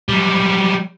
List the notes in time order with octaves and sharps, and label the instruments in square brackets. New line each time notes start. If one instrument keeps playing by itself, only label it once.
[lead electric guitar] F#3 G3